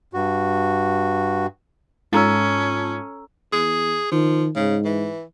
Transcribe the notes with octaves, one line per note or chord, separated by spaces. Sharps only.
G2 F#4
G#2 C#4 F4 A4 A5 A#5 E6
E2 G#4
D#3 F3
G#2 C#3
E3